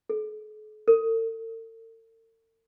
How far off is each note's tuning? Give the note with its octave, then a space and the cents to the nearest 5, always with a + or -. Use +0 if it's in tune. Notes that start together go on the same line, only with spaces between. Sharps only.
A4 -45
A4 +45